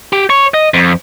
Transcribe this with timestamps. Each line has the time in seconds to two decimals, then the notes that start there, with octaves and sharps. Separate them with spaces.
0.13 G4
0.30 C#5
0.54 D#5
0.74 F2